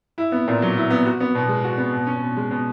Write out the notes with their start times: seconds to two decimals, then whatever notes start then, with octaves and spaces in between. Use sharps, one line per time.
0.18 E4
0.32 B3
0.48 A#2
0.62 F#3
0.77 E4
0.90 B3
1.06 F#4
1.20 B3
1.35 B2
1.49 G#3
1.64 F#4
1.77 B3
1.93 B2
2.07 C#4
2.22 B2
2.37 G#3
2.51 B2